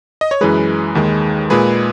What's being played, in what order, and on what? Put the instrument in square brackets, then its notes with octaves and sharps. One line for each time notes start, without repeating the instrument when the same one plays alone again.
[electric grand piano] D#5
C#5
F#2 E3 G#3 G#4 B4
D#2 D#3 G#3
A#2 G#3 G#4 B4